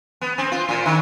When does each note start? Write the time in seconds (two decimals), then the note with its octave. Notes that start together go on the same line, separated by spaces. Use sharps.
0.21 B3
0.38 C4
0.52 F4
0.69 A#2
0.86 D#3